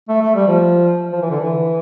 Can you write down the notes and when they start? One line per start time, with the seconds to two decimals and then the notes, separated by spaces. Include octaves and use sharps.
0.09 A3
0.21 A3
0.35 G3
0.48 F3
1.12 F3
1.21 E3
1.31 D3
1.41 E3